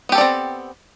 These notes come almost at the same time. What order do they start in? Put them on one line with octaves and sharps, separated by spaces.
B3 G4 A4 D5 C4